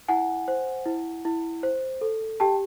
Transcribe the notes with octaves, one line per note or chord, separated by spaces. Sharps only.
E4 F#5 G#5
C5
E4
E4
C5
A4
G4 G5 A5